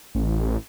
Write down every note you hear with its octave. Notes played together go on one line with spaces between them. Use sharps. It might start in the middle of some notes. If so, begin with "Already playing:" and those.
A1